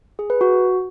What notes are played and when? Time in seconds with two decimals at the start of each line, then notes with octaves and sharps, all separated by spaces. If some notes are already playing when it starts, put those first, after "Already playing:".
0.19 G#4
0.30 B4
0.41 F#4